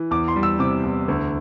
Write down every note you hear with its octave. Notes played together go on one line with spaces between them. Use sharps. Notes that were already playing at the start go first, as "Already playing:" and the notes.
Already playing: E3
E2 D6
C6
G3
E6
C3 D6
E2
D2